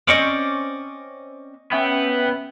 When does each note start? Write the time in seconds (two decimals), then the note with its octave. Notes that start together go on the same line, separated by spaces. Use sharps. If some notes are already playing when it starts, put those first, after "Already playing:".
0.08 C4 C#4 D5 D#5 C#6 D6
1.72 B3 C#4 E5 G5